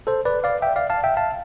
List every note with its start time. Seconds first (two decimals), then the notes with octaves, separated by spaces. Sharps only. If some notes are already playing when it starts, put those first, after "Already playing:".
0.07 A4 C5
0.25 B4 D5
0.44 D5 F5
0.62 E5 G5
0.76 D5 F5
0.90 F5 A5
1.04 E5 G5
1.17 F5 A5